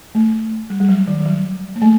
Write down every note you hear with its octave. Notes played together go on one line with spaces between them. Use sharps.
A3
G3
G3
F#3
D#3
D#3
F#3
A#3
A3